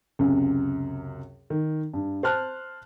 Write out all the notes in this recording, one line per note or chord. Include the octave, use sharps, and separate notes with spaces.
C#2 F#2 C3
D#3
G2
C5 A5 F6 F#6